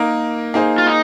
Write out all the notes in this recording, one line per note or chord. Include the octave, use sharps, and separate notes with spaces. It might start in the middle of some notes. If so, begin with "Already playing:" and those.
Already playing: A#3 D#4 A#4
A#3 D#4 G#4 C5
F4
D#4